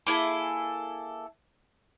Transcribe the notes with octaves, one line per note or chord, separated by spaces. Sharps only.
A#3 E4 G#4 A4